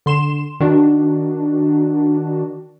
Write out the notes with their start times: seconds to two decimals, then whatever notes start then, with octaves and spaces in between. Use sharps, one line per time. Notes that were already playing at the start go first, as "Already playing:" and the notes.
0.06 D3 C6 E7
0.60 D#3 D4 F#4